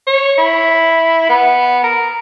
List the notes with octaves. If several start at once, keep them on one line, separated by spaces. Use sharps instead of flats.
C#5
E4
B3
A#4